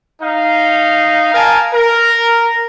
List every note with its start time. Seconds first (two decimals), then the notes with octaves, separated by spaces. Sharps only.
0.22 D#4 F5
1.34 A#4 F5 G#5 A5
1.73 A#4